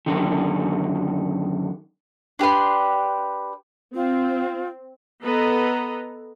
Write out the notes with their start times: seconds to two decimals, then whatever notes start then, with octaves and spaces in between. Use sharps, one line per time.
0.06 F#2 A2 D3 D#3
2.39 D4 G4 B4 C6
3.95 C4 F4
5.23 B3 A4 B4 D#5 A#5